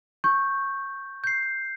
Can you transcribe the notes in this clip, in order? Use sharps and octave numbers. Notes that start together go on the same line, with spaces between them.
C#6 G6
G6 C7